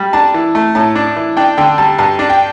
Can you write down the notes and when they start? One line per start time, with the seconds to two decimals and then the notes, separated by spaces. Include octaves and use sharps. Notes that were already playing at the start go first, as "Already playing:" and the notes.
Already playing: G3
0.13 D4 A5
0.34 E3
0.55 A3
0.75 A2 A5
0.95 D4
1.16 E3
1.37 D4 G5
1.57 D3 G5
1.78 G3 A5
1.98 G2 A5
2.19 D4
2.30 G5